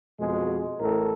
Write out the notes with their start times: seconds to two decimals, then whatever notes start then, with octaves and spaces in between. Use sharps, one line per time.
0.19 F2 B2 G#3
0.80 A1 A2 A4 A#4